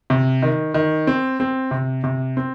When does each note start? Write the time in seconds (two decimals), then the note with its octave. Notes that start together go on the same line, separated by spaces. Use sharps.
0.10 C3
0.43 D#3
0.74 D#3
1.07 C4
1.40 C4
1.71 C3
2.04 C3
2.37 C4